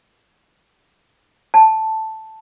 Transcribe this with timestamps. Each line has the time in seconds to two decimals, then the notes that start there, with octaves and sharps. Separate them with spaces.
1.54 A5